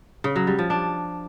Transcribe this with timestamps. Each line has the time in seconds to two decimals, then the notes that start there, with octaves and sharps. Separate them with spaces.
0.24 C#3
0.36 F#3
0.47 G3
0.59 F3
0.70 D4